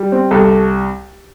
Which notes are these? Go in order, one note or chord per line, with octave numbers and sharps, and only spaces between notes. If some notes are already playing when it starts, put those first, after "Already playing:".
Already playing: G3
C4
C2 A4